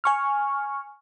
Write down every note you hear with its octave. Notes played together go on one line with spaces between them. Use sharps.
G#5 C#6 F6